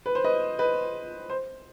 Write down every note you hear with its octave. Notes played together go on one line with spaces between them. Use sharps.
B4
C5
B4 D#5
B4 D#5
C5